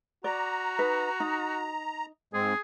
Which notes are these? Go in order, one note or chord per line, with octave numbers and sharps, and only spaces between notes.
F#4 D5 A#5
D#4 B4
D#4
G#2 G#3 C4 G#4